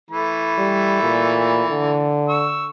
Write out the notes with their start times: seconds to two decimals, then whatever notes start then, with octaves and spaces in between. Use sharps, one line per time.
0.11 E3 A3 B5
0.58 G3
1.03 A#2
1.71 D3
2.29 C#6 E6